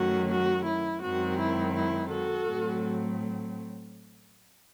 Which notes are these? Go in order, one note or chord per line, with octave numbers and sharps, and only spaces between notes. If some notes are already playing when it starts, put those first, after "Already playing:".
Already playing: F#2 D#3 F#3 A3 C#4 F#4
F#4
E4
F#2 D#3 G#3 C4 F#4
E4
E4
F#4 A4
A2 F#3 A3 C4